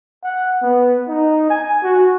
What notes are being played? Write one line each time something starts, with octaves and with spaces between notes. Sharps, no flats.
F#5
B3
D#4
G#5
F#4